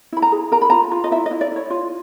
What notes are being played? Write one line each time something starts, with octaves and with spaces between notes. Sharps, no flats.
E4 B5
A#5
G#4
A#4 A#5
B5
F4 A#5
F4
D#5
E4 E5
D#5
E4
D5
E4 C#5
F4